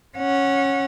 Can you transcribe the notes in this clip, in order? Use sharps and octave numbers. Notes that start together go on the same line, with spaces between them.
C#4 F#5